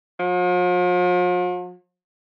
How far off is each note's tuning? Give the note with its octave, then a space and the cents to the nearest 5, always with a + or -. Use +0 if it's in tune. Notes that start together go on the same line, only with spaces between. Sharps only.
F3 +45